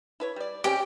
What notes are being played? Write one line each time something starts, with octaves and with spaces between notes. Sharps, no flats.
E4 B4 C#5
G3 D5
G#3 C4 C#4 G4 G5